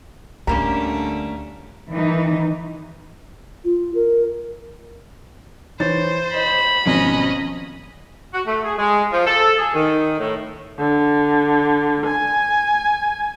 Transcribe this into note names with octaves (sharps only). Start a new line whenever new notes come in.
D2 A2 D3 G3 A3 A#3 C#4 A#5
D#3 E3 D#4
F4
A#4
E3 C5 C#5 A6
D#5 B5
G#1 B2 F3 C#4 D#5
F#4
A3
G#4
G#3
F3
A4
G#4
D#3
A2
D3
G#5